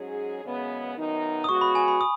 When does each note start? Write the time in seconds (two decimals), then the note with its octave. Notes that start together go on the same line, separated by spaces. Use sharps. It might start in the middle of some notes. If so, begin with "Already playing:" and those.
Already playing: G#2 F#3 C#4 G#4
0.44 F#2 C#3 G#3 B3
0.96 F#2 D#3 B3 D#4
1.44 D#6
1.49 C#3 G#3 B3 F#4 C#6
1.61 B5
1.75 G#5
1.88 B5
2.01 D#6